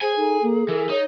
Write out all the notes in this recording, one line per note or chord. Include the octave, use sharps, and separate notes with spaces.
G#4 C5 G#5
D#4 A4
A#3
E3 A#4
D#4 C#5